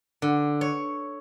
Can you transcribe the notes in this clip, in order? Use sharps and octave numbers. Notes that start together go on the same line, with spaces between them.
D3
C#5